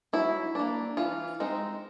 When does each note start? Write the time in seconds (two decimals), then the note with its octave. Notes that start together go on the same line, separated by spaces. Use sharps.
0.13 F#3 E4
0.55 A#3 D4
0.97 E3 F4
1.40 G#3 C4 D#4